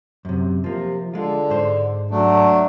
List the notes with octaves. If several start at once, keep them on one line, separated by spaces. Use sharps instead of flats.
F#2 C3
C3 F3 A#3
D3 G#3 F4
G#2 G#3 C5
F#3 A3 D4